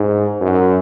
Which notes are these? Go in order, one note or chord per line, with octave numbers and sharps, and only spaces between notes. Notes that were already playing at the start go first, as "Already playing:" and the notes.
Already playing: G#2
F#2